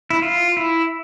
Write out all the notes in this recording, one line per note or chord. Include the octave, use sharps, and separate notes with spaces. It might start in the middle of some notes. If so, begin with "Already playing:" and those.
E4
F4
E4